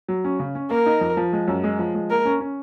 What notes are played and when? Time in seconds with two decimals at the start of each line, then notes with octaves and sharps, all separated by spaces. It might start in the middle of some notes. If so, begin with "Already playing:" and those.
0.08 F#3
0.24 C#4
0.40 C#3
0.55 C#4
0.71 A#3 A#4
0.86 D#4
1.01 F2
1.17 F3
1.33 G#3
1.48 F#2
1.64 G#3
1.79 F3
1.95 G#3
2.10 A#3 A#4
2.25 C#4
2.40 C#4